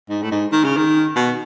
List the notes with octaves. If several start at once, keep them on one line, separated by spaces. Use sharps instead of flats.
G#2
A2
G#2
D#3
C#3
D#3
B2